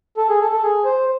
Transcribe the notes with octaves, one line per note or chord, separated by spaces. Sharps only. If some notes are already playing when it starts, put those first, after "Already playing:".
A4
G#4
A4
A4
G#4
C5